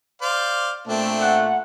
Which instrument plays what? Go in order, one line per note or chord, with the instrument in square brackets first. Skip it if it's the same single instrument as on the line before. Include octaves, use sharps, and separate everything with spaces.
[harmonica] C5 D5 F5
[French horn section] A#2 A3 [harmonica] C4 D4
[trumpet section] F#5